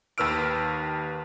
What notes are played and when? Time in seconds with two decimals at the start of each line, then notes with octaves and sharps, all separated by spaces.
0.18 D#2 D#3 B4 E6 F6 D7